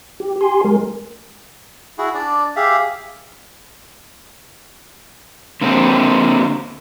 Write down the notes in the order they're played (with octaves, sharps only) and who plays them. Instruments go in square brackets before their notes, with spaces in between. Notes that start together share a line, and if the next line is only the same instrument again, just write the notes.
[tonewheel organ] G4
G4 G#5 C6
G#3 A#4
[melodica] E4 F#4 G#4
D4 D5
G4 G#4 E5 F5
[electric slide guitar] D3 A#3 C4